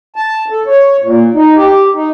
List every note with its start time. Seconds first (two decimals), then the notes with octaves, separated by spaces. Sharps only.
0.16 A5
0.51 A4
0.67 C#5
1.03 A#2
1.34 D#4
1.56 G4
1.94 D#4